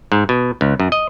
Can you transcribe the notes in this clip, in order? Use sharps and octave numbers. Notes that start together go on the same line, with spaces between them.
G#2
B2
C#2
F#2
D#5